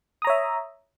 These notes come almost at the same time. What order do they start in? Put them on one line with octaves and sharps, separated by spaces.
D#6 A#5 C#5 E5